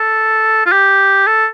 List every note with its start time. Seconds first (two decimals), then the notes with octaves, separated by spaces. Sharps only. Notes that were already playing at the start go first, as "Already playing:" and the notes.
Already playing: A4
0.66 F4
0.72 G4
1.27 A4